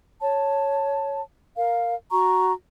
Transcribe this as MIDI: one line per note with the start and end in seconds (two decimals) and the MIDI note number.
0.20 1.20 73
0.20 1.20 81
1.56 1.94 70
1.56 1.94 77
2.10 2.52 66
2.10 2.52 82
2.10 2.52 85